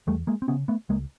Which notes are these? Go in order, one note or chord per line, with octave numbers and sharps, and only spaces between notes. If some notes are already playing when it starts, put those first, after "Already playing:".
E2 G3 A3
G#3 A#3
C4
C#3 B3 C#4
A3 B3
C#2 G#3 A#3